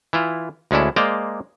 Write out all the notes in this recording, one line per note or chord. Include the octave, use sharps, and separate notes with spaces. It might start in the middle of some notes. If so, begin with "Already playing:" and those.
E3 E4 F4
D2 G#3 C#4 D4 E4
G#3 A#3 C5 D5 D#5 A#5